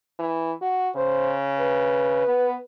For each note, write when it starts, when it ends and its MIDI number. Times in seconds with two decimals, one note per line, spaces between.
0.19 0.53 52
0.62 0.90 66
0.97 2.27 49
0.97 1.34 72
1.58 2.64 71
2.28 2.55 59